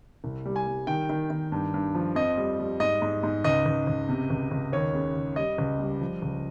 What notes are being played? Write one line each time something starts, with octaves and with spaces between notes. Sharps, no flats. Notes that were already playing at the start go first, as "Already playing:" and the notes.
C2
G3
G#5
G3
D#3 G5
D#3
D#3
G2
G2
F3
F2 D#5
G3
G3
G#2 D#5
G#2
G#2
C#2 D#5
C#2
C#2
C3
C#2
C#2
D#2 C#5
C#3
C#3
G3 D#5
C#2
G3
F3
C#2